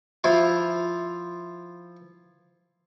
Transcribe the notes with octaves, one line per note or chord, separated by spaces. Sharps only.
F3 E4 F4